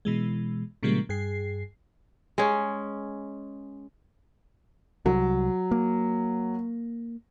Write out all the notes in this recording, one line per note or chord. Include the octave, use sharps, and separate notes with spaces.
B2 E3 G#3
A#2 C#3 F3 G3 G#3 A#3
G2 G#4 C7
G#3 C#4
C2 F#3
A#3